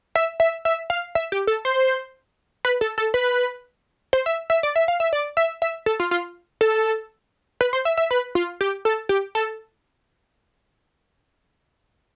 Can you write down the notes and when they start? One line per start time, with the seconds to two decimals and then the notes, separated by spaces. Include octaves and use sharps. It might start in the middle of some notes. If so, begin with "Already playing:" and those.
0.15 E5
0.40 E5
0.65 E5
0.90 F5
1.15 E5
1.32 G4
1.47 A4
1.65 C5
2.65 B4
2.81 A4
2.98 A4
3.14 B4
4.13 C5
4.26 E5
4.50 E5
4.63 D5
4.76 E5
4.88 F5
5.00 E5
5.13 D5
5.37 E5
5.62 E5
5.86 A4
6.00 F4
6.11 F4
6.61 A4
7.61 B4
7.73 C5
7.85 E5
7.97 E5
8.11 B4
8.35 F4
8.61 G4
8.85 A4
9.09 G4
9.35 A4